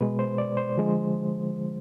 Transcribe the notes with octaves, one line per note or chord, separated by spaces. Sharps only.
B2 G#3 B4
C5
D5
C5
D3 F3 G#3